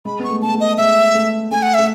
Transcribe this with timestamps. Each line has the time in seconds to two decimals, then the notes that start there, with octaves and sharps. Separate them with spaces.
0.05 G#3 B5
0.19 B3 C#6
0.30 A3
0.42 B3 A5
0.54 A3
0.60 D#5
0.78 G#3 E5
1.15 A3
1.51 A3 G#5
1.63 F#5
1.74 E5
1.79 A3